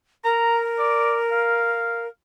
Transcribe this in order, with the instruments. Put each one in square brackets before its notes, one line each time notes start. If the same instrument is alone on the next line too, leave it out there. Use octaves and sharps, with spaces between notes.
[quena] A#4 [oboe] A#5
[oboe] D5
F5